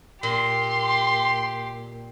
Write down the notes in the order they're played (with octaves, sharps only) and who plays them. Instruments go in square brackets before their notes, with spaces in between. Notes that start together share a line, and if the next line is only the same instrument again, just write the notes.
[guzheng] A#2 [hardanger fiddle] G4 [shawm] C6